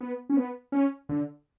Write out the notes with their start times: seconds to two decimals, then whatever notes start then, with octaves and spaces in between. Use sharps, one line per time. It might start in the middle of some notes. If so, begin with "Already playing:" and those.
0.01 B3
0.30 C#4
0.37 B3
0.72 C#4
1.09 D3